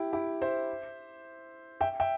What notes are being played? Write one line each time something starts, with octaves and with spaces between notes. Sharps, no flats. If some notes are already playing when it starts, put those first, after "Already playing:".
Already playing: E4 G4
E4 G4
C5 E5
E5 G5
E5 G5